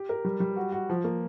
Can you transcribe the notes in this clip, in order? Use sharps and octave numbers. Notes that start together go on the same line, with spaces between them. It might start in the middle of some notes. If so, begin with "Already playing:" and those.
Already playing: G4
A#4
G3
G3
F#4
F#4
F3
A#3